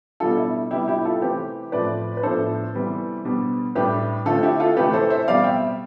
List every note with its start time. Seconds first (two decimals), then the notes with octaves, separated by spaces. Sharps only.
0.20 B2 G3 D4 F4 A4
0.37 E4
0.71 C3 G3 B3 D4 E4 G4
0.88 E4 G4
1.05 F4 A4
1.22 C3 E3 A3 C4 G4 B4
1.72 A2 F3 A3 C4 B4 D5
2.17 B4
2.23 A2 F3 B3 D4 A4 C5
2.74 C3 E3 G3 B3
3.25 B2 G3 D4
3.75 A2 G3 D4 G4 B4
4.26 D3 A3 C4 F4 A4
4.43 E4 G4
4.60 F4 A4
4.77 C3 E3 A3 G4 B4
4.93 A4 C5
5.10 C5 E5
5.28 B2 G3 C4 D5 F5
5.44 E5 G5